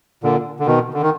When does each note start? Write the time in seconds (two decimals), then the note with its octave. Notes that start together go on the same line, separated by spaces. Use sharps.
0.23 A#2 D3
0.60 D3
0.66 B2 D#3
0.94 D3
1.02 D#3